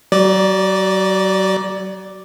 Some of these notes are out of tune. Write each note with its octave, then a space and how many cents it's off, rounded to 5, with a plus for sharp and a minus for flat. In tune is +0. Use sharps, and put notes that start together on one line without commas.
F#3 +35 D5 +0